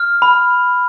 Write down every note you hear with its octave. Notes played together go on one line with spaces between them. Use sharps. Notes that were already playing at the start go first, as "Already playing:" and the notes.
Already playing: F6
B5